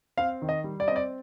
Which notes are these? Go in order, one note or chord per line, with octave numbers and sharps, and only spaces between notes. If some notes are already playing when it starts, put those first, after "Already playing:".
C4 F5
D#3
D#5
G3
D5
C4 D#5
D5